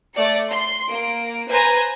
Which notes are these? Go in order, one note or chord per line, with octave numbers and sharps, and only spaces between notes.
A3 D5 C#7
C6
A#3 D7
B4 C5 G#5 A#5